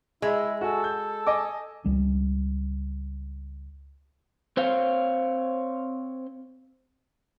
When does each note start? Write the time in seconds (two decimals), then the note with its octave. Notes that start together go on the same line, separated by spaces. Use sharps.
0.22 G#3 E4 E5
0.61 F#4 A4 G#5
0.84 G6
1.27 D#5 G#5 D6
1.84 C#2 G3 D4
4.57 C4 C5 C#5 F5